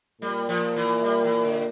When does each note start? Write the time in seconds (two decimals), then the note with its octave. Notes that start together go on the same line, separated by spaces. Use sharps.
0.22 A#2 G3
0.49 F3
0.76 E3
1.04 G3
1.24 E3
1.45 D3